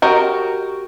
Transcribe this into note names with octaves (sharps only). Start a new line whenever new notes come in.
F#4 G4 A#4 D#5